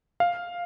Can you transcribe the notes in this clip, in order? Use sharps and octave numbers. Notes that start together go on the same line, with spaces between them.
F5